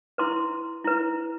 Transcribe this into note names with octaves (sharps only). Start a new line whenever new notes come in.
E4 B4 C6
E4 B4